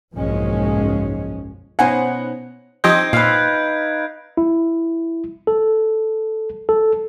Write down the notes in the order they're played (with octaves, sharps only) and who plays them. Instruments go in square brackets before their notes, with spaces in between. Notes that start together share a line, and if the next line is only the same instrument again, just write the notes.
[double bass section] F#1 B1 G#2 F3 G#3 C#4
[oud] B2 D#4 C5 [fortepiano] B3 C#4 [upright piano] F#5 [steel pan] G#5
[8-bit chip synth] F3 G4 D#5 [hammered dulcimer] C4 D#4 [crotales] G6 G#6 D7
[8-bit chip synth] A#2 [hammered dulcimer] B4 F5
[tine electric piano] E4
A4
A4